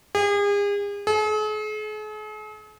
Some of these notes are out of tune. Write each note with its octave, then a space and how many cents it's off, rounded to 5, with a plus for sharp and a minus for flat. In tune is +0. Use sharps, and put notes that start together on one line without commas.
G#4 -40
G#4 +45